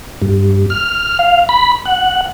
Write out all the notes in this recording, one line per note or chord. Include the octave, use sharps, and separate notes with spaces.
G2
F6
F5
B5
F#5